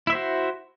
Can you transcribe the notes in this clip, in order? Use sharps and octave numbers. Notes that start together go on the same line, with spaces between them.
E4 F#4 C5 E5